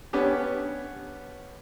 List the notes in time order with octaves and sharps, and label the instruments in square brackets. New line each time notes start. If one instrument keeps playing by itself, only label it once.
[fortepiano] B3 C#4 D4 G4